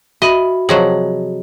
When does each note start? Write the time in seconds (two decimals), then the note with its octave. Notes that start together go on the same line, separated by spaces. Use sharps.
0.22 F#4 D#5 E5 B5
0.69 C3 F3 F#3 G#4 C#5 D#5